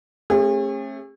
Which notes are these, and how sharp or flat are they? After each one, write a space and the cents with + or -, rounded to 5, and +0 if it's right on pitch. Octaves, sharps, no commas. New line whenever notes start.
A3 +0 C#4 -40 G#4 -45